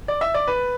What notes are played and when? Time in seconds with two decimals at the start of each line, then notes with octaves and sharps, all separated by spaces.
0.08 D5
0.21 E5
0.34 D5
0.48 B4